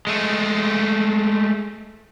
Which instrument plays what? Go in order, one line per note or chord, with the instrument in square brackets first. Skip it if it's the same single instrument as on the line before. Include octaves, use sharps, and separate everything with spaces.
[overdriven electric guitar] G#3 A3